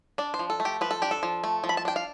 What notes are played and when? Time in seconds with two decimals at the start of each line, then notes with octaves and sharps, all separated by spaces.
0.18 D4 D5
0.34 C5
0.39 F3
0.50 A4
0.60 A3
0.65 G4
0.81 F3 B4
0.91 A4
1.02 D4 G4
1.11 A4
1.23 F3
1.44 A3
1.64 F3
1.69 B5
1.77 A5
1.85 D4 G5
1.96 F5